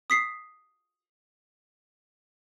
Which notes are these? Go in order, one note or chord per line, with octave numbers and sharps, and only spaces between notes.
D#6 B6 C7